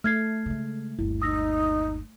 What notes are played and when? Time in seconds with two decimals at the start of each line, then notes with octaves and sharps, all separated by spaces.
0.04 A3 F6 G#6 C7
0.46 C#3 G#3
0.99 G1 D#2 E4
1.22 D#4 D#6 E6 A#6